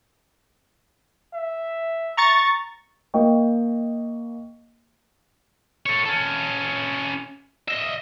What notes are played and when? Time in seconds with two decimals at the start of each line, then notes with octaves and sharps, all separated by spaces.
1.34 E5
2.17 A#5 C#6 A6
3.14 A#3 D#5 G5 C#6
5.86 A4 C#5
6.06 C#4 A4
7.68 D#5 E5